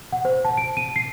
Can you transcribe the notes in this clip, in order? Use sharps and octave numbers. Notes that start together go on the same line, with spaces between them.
F#5
C5
A5
D7
D#7
C7